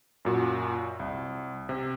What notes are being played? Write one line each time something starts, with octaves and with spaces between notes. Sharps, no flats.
F#2 A#2 F#4
C2
C3